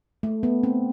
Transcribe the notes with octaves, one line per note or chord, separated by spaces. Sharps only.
A3
B3
C4